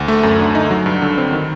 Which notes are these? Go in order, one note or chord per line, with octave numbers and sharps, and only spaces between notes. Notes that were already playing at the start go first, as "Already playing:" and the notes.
Already playing: D2
A3
F#2
D3
D#4
F#3
G2
D3
C4
D#3